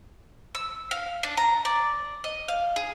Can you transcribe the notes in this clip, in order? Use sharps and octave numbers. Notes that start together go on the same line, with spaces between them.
E6
F5
D4
A#5
D5
D#5
F5
G#4